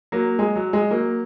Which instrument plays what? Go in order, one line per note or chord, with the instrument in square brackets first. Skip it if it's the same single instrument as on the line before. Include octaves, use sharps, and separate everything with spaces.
[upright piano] F#3 A#3
G#3
F#3
G#3
F#3 A#3